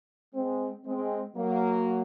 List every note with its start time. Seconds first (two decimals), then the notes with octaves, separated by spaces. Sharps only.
0.34 G#3 C4
0.85 G#3 C4
1.36 F#3 A#3